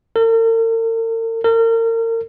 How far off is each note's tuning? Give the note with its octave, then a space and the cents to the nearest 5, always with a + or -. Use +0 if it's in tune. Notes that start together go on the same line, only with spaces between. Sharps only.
A#4 -45
A#4 -35